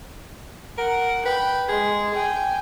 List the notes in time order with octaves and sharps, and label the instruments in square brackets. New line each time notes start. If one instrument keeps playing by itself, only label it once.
[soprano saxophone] A#4 [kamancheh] F#5
[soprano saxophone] B4 [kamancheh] G5
[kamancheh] G#3 [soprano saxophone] G#4
[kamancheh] G5 G#5